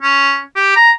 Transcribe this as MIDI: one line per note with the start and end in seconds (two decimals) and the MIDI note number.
0.02 0.40 61
0.56 0.75 67
0.76 0.91 82